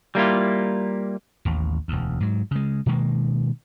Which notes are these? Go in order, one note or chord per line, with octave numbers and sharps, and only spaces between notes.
G3 A#3 E4 F4
A1 D#2
E1 D2
G#2 F#3
C#3 G#3
B2 D#3 G#3 A#3